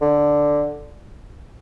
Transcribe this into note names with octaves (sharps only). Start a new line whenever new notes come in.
D3